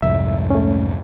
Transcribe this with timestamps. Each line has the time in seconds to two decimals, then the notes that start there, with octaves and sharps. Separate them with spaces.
0.02 C2 F2 G#2 E5
0.50 A3 C#4